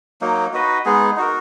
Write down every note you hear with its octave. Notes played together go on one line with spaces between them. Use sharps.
F#3 A#3 D#4
D#4 F#4 B4 D#5
G#3 B3 D#4 G#4
D#4 F#4 A#4